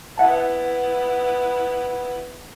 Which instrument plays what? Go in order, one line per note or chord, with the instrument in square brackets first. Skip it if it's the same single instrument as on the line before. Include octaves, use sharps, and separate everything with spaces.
[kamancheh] B3 E4 [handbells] E5 F#5 A5